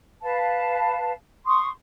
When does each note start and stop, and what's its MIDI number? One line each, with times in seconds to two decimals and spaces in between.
0.22 1.11 71
0.22 1.11 77
0.22 1.11 81
1.46 1.68 84
1.46 1.68 85
1.46 1.68 87